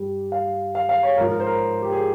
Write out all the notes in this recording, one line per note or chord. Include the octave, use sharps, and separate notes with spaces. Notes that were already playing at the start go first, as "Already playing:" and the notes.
Already playing: G2 G3
F5
F5
F5
C#5
G#2 F3 A#4
A#4
C5
A#4
G4
G#4